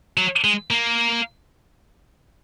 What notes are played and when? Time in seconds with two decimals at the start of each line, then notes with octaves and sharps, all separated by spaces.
0.17 F#3
0.44 G#3
0.71 A#3